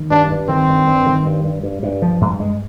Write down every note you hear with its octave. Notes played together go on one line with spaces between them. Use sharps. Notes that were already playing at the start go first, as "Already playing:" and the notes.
Already playing: D#3
G2 D4
G2
D#3 C4
G2
G2
D#3
G2
G2
G2
G2
F3
G2
G#3